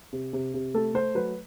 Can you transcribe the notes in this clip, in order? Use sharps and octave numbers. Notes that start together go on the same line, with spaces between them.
C3
C3
C3
A3 A4
A3 C5
F#3 B4